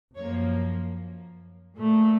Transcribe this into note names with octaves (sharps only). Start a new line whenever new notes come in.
F#2 F3 A#3 C#5
A#2 A3